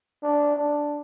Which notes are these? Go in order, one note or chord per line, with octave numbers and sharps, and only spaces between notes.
D4
D4